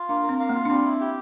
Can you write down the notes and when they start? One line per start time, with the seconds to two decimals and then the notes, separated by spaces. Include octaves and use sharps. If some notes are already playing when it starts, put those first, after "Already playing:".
Already playing: F4
0.09 A#3 D4
0.23 A#4
0.29 C4
0.40 F5
0.49 A#3
0.55 F4
0.65 D4
0.69 G3 C4
0.85 E4
1.01 G4